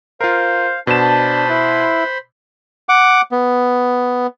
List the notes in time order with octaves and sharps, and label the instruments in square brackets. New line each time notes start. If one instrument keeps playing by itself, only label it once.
[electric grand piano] F4 A#4 [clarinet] C5 [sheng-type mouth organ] F5
[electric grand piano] B2 E7 [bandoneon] D4 [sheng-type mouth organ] C5 B5 C6 [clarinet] A5
[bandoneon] E4 [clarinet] B4
[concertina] F#5 D6
B3